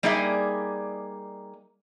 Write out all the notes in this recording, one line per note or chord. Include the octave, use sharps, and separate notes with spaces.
G3 A#3 D#4 G#4 D5 E5